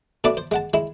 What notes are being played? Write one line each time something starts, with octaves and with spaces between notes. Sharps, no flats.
B2 A3 D4 D5 B5
C5
G#3 F#5 A5
G#3 E4